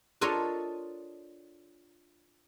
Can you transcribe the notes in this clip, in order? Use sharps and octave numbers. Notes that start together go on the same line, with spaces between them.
D4 F4 A4 A#4 C#5 D#5